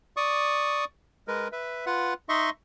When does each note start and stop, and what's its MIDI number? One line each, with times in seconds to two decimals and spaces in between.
0.17 0.85 74
0.17 0.85 85
0.17 0.85 87
1.28 1.48 56
1.28 1.48 70
1.28 1.48 71
1.52 1.86 71
1.52 1.86 76
1.86 2.14 65
1.86 2.14 71
1.86 2.14 78
2.29 2.50 63
2.29 2.50 75
2.29 2.50 76
2.29 2.50 84
2.29 2.50 85